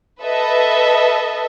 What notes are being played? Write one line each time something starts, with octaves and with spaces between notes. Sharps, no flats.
A4 B4 D#5 E5